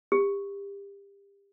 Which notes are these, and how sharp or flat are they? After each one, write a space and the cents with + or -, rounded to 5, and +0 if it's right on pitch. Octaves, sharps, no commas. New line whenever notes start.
G4 +30